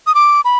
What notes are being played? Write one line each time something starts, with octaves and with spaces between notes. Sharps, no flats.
D#6
D6
B5